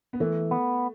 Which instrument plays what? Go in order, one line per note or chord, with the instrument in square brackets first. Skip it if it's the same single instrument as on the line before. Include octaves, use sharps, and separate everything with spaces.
[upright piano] B3
[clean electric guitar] E3 [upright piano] A3
[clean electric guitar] B3